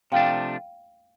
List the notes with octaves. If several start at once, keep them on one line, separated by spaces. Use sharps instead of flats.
C3 F3 A3 D4 F5 G5